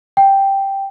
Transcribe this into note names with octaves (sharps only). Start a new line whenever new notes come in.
G5